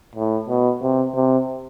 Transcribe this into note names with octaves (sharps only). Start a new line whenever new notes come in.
A2
B2
C3
C3